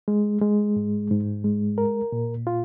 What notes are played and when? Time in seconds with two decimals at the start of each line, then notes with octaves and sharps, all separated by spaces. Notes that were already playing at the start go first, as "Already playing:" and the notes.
0.08 G#3
0.42 G#3
0.76 G#2
1.11 G#2
1.44 G#3
1.78 A#4
2.12 A#2
2.47 F4